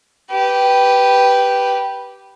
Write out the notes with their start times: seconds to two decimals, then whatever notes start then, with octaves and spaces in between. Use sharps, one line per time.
0.31 G4 B4